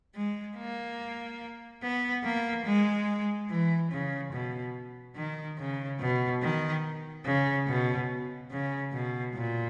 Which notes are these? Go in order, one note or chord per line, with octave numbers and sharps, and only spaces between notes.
G#3
A#3
B3
A#3
G#3
E3
C#3
B2
D#3
C#3
B2
D#3
C#3
B2
C#3
B2
A#2